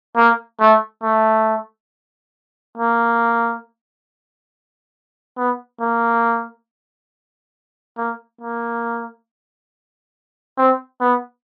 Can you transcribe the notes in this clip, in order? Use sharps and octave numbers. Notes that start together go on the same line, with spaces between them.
A#3
A3
A3
A#3
B3
A#3
A#3
A#3
C4
B3